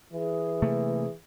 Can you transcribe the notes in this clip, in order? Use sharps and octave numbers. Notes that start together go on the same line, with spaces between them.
E3 G#4
C3 A3 A#3